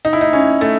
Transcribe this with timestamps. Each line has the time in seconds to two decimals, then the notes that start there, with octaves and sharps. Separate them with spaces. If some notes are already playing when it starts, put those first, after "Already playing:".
0.05 D#4
0.13 E4
0.21 D#4
0.33 C#4
0.61 A3